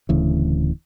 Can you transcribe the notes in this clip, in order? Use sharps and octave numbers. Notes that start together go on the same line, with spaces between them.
D1 D2 C#3 E3